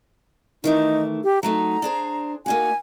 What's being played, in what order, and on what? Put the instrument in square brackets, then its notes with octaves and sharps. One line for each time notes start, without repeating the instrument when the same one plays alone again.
[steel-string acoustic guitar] D#3 E3 A3 [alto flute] D#4
[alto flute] G4
[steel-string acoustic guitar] F#3 A3 D#4 [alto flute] A#5
[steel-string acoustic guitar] D4 G#4 C5
[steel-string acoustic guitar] A#3 D#4 F#4 [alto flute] G#5